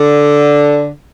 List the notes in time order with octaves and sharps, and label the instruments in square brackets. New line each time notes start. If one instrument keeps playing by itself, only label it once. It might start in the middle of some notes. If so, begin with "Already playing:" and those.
Already playing: [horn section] D3